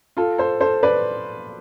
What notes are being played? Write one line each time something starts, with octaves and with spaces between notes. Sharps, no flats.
F4 A4
A4 C5
A4 C5
B4 D5